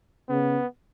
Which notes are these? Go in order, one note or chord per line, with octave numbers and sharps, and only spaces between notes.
C#3 B3